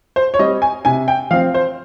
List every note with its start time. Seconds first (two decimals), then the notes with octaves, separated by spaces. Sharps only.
0.16 C5
0.34 C#5
0.39 G3 C4 D#5
0.62 G#5
0.85 C3 G#5
1.08 G5
1.31 F3 F5
1.34 C4
1.54 C5